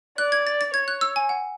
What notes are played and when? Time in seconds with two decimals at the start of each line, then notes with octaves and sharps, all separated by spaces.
0.18 D5 F#6
0.32 G#6
0.47 A6
0.61 A6
0.74 C#5 G#6
0.88 F#6
1.01 E6
1.16 G#5
1.29 F#5